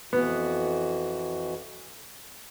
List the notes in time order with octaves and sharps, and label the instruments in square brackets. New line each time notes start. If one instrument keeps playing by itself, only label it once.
[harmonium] F2 E3 F#4 [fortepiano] B3